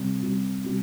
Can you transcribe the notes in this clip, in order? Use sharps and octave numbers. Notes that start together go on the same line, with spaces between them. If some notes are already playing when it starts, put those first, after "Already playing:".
Already playing: C3 G3
C3 G3
C3 G3